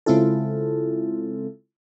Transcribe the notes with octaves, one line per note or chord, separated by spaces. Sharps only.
C#3 G#3 C4 E4 F4 A4